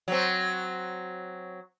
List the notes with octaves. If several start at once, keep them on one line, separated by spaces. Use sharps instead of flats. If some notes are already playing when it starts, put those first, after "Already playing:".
F#3 C4